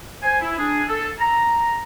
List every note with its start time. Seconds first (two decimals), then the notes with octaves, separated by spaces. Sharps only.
0.22 C5 G#5
0.41 E4
0.58 D4 G#4
0.89 A4
1.19 A#5